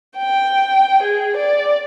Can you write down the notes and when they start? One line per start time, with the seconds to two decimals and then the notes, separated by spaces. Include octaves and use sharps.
0.18 G5
1.02 G#4
1.36 D5